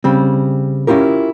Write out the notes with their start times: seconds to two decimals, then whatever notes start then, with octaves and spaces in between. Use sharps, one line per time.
0.04 C#3 G3 C4
0.87 C#4 E4 F4 G4 A#4